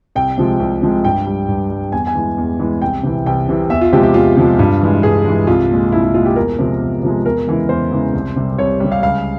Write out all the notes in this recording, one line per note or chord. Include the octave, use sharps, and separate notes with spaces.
C2 G5
C3 F3 G#3
C2
C3 F3 G#3
G2 G5
G3
G2
G3
E2 G#5
G#5
E3 G#3
E2
E3 G#3
C2 G5
C3 E3
C2 G5
C3 E3
E2 E5
F4
C3 F3 G#3 G4
G4
E2 F4
C3 F3 G#3
G2
E3 G#3
G2 G#4
E3 G#3
C2 F4
A#2 G#3
C2 E4
E4
A#2 G#3 F4
G4
E2 A#4
C3 F3 G#3
E2
C3 F3 G#3
E2 A#4
C#3 E3 G#3
E2 C5
C#3 E3 G#3
C2
C3 G3
C2 C#5
C3 G3
F5
C#2 F5